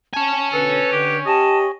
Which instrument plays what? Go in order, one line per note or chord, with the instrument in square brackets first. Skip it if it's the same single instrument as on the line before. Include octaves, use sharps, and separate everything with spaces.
[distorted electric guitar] C#5 G#5 [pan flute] A5
[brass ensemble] B2 D3 [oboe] A4 [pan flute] B4
[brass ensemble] D3 [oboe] G4
[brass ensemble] G4 [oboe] D#5 [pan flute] A5